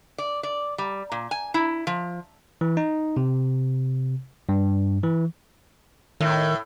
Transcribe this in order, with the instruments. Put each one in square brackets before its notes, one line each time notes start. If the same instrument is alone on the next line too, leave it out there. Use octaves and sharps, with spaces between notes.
[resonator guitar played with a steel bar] D5
D5
G3
A#2
G#5
E4
F3
[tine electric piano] E3
D#4
C3
G2
E3
[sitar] A2 [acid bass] D#3